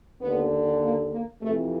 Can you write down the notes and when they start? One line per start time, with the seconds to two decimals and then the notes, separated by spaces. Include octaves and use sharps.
0.21 D#2 D3 B3
0.82 A#3
1.12 A#3
1.42 F2 C3 E3 A3